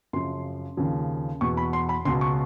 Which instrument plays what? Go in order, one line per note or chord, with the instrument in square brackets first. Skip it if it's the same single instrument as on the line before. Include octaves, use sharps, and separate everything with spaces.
[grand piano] F#2 C#3 F3 C6
D#2 C#3 F3
E2 B2 C#6
B5
C6
B5
C#2 B2 C6
C#6